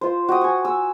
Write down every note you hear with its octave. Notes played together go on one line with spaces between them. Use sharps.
F4 C5
F#4 G5 D#6
G#5 C#6
E6